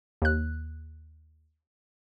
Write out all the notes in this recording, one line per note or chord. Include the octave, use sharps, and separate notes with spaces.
D#2 F#6